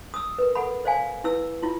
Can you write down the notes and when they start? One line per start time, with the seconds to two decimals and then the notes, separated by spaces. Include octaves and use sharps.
0.14 D#6 E6
0.39 A#4 B4
0.55 A4 F#5 B5
0.85 C5 D5 F5 G#5
1.24 E4 B4 E6
1.62 E4 F4